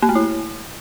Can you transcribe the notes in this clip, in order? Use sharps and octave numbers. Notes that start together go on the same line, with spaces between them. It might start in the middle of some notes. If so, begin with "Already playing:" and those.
A#3
A3
E4